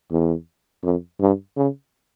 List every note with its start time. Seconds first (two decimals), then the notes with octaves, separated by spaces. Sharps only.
0.11 E2
0.84 F2
1.21 G2
1.56 C#3